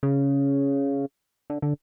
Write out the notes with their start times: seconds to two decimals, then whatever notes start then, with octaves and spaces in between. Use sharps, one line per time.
0.03 C#3
1.50 D3
1.62 D3